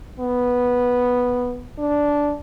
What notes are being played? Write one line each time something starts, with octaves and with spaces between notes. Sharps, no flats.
B3
D4